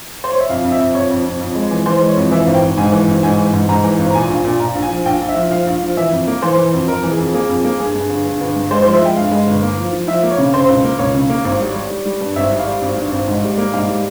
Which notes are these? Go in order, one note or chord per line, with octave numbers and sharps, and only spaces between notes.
C5
C#5
E5
F2 F5
F2
E5
F2
F2 C#5
F2
F2
F2
G#3
E3
E3 C5
G#3
C#5
F2
E3 E5
G#1
G5
G#1
G#2 G#5
E3
G#1
G#2 G#5
E3
G#2
G#2 A#5
E3
G#1
A#5
A#2 G#5
A#1
A#2
A#2 A#5
A#1
G#5
F3
A#1 G5
A#1
E5
F3
F3 F5
A#1
F3
E3 E5
F2
A#3
E3 C5
E3
F2
F2 A#4
E3
G#4
F2
A#3 G#4
F2
A#3
G2 G#4
G2
G1
G2
G1
G2
G#3 C5
F3 C5
E5
G#3 G5
G2 F5
G#3
G1
A#3
F3
F3
F3 E5
A#3
C#5
C#3
C#3 C5
C#2
A#3
C#2 C#5
C#3
A#3
G#1
G3
G3
G3
G3
G2
G#1 E5
G3
F5
G3
G#1
G2
G#1
G#2
G3
A#3
G#2 F5
G3